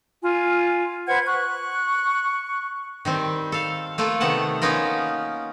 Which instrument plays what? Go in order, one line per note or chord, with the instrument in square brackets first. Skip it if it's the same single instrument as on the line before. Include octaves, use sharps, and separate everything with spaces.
[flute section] F4 G#5
B4 C5 F#5 G#6
C#6 F#6
[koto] D#3 G3 C4
A4 F5
A3 A#3 F4 A4
C3 D#3 B3 F#5 A5
A#3 B3 C#4 D#4 F4 A#4